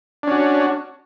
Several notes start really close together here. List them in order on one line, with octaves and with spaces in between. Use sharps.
D4 C#4 F#4